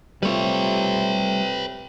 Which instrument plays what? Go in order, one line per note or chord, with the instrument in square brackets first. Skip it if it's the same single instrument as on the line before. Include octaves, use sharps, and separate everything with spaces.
[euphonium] C3 [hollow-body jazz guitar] G3 A3 F4 [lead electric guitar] B4 C#5